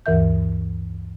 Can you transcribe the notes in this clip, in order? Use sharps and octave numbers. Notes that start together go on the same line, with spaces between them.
D2 G2 E3 A#4 E5 G6